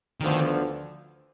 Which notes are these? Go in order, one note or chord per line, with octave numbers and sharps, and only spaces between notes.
D2 D3 D#3 F3 B3